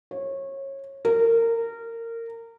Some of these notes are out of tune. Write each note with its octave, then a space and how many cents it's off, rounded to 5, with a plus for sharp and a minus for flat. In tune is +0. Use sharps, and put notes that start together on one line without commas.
C#5 -25
A#4 -25